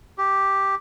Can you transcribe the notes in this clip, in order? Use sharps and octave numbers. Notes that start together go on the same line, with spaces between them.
G4